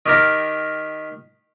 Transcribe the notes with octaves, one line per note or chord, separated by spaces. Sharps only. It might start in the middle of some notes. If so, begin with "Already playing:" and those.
D#3 G4 A#4